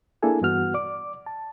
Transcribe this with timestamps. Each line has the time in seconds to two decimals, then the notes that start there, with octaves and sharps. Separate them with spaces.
0.23 A#3 D4 E4 G#4 A4 G#5
0.42 G2 E3 B3 F#4 F#5 F6
0.74 D5 D6
1.26 A5